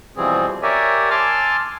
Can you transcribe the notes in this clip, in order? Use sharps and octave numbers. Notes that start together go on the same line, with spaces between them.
B2 E3 F3 G3 C4 G#4
G4 A#4 C#5 D5 E5 G#5
G#5 A5 C6 D6 E6 F6